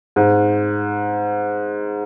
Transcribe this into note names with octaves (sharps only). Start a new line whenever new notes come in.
G#2